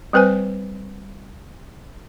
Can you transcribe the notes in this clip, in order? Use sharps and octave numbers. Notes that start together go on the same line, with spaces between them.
G3 C4 B4 C5 G#5